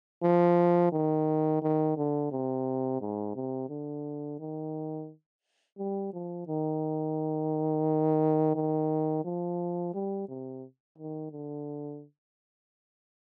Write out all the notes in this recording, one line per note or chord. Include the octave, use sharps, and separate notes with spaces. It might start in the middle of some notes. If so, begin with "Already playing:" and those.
F3
D#3
D#3
D3
C3
G#2
C3
D3
D#3
G3
F3
D#3
D#3
F3
G3
C3
D#3
D3